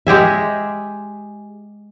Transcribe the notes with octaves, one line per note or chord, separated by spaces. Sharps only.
G#3 G4 G#4 E5